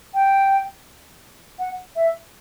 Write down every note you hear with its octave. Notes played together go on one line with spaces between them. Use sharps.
G5
F#5
E5